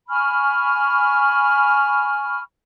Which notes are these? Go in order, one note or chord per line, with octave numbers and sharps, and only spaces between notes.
G#5 B5 C#6 F6